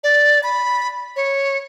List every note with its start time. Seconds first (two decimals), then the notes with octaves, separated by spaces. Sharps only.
0.04 D5
0.43 B5
1.16 C#5